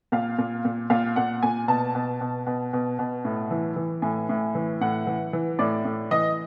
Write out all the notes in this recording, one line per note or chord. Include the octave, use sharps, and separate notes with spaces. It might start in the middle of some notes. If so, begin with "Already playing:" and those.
A#2 F5
A#2
A#2
A#2 F5
A#2 F#5
A#2 G#5
B2 A5
B2
B2
B2
B2
B2
A2
E3
E3
A2 G#5
A2
E3
A2 F#5
E3
E3
A2 D5
A2
E3 D#5